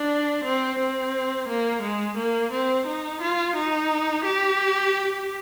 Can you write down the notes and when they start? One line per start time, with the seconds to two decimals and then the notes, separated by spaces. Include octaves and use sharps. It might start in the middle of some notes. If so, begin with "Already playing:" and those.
Already playing: D4
0.44 C4
0.79 C4
1.49 A#3
1.83 G#3
2.17 A#3
2.52 C4
2.87 D#4
3.21 F4
3.56 D#4
4.25 G4